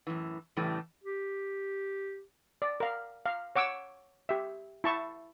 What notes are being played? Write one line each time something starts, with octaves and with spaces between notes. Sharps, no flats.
F#2 A2 E3
A2 C#3 E3 G3 A3
G4
D5
A#4 F5
F5
C#5 F#5 D6 E6
G4 E5
E4 A5 C#6